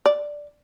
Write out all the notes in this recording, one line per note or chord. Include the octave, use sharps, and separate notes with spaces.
D5